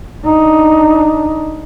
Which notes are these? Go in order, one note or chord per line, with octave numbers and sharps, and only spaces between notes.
D4 D#4